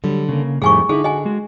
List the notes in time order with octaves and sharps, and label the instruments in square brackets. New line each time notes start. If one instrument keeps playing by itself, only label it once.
[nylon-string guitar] D3 [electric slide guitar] F#3 G3
[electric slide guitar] C#3 A#3
[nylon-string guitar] F2 D#3 [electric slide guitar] A2 G3 A3 [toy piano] G#4 G#5 C#6
[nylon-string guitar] D3 [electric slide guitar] D#4 E4 [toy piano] G#4
[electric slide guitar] F#4 [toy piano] D#5 G#5
[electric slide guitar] G#3 F#4